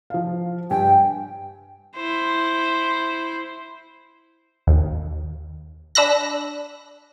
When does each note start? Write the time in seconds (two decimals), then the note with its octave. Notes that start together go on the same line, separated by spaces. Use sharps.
0.10 F3 F5
0.70 G2 G5 G#5
1.96 E4 C5
4.67 D#2
5.95 D4 B5 E6 F#6 A#6